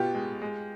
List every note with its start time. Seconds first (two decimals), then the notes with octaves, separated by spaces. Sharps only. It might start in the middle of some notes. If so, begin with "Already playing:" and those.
Already playing: B2 B3 F4 G4
0.14 G#3
0.42 G#3